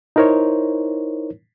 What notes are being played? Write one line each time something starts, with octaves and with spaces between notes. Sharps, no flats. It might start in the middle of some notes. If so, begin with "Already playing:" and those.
D#4 E4 A#4 C5 C#5